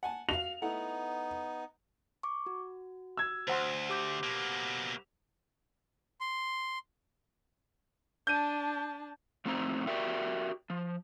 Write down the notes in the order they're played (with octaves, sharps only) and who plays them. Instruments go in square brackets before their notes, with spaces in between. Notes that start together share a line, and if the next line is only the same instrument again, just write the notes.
[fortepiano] F#5 G#5 A5
[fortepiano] F#4 F5 [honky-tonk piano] F7
[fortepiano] A3 E4 F#5 [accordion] B3 D#4
[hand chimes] C#6 D6
F#4
[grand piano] E6 G#6
[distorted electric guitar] D2 [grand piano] C5 F#5 C6
[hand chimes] G4 D6 G6
[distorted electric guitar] B2 A#3
[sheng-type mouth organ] C6
[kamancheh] D4 A5 [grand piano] G6 D#7
[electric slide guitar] F2 A2 C4 D#4 C5 A#5
F#4 G4 A#4 D5 E5 G5
F3